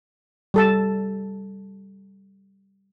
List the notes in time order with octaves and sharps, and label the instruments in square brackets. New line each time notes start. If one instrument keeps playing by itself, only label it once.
[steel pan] G3 A4 A5